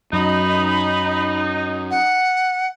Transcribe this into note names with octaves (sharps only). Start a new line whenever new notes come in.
F#2 D#4 B5
F#5